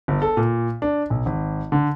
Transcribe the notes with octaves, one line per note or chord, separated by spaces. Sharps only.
G1
A4
A#2
D4
B1
G#1
D3